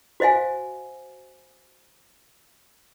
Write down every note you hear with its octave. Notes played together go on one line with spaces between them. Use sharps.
F#4 C5 D#5 F5 G#5